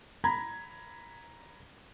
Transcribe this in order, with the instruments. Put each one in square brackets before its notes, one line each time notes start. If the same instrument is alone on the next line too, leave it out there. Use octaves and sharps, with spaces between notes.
[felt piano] A#5 B5 G#6